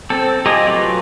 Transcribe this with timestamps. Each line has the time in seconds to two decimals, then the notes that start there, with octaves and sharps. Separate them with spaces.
0.10 C4 A4
0.45 F4 G4 G#4 D#5 A#5
0.67 F#3 A3 F4 B4